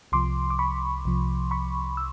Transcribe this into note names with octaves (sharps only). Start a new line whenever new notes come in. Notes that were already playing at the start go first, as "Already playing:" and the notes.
C2 C3 F3 C6 D6
D6
B5 C#6
C2 C3 F3
B5 C#6
E6